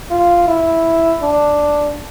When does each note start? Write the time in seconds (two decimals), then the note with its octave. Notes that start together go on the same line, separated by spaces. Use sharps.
0.11 F4
0.48 E4
1.22 D4